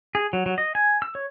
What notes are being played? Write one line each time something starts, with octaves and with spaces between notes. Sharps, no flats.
G#4
F#3
F#3
D#5
G#5
E6
C#5